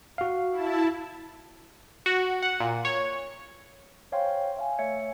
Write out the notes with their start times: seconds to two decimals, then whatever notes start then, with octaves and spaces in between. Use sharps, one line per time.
0.18 F#4 F5
0.51 E4 A5
2.06 F#4
2.42 F#5
2.60 A#2
2.85 C#5
4.12 C5 C#5 F5 G5 G#5 C6
4.57 E5 F5 G#5
4.79 A3 C#5 E5 G#6 C#7